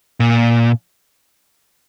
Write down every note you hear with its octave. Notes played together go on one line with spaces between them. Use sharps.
A#2